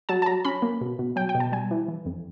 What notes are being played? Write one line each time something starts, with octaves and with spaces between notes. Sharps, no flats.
F#3 A5
A5
F#3 A#5
C#4 B5
A#3
B2
B2
F#3 G5
G5
B2
A5
G3 G#5
E3
E3
F2